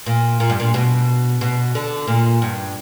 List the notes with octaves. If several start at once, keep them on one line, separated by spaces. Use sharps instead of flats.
A#2
A#2
G2
A#2
B2
B2
D3
A#2
G2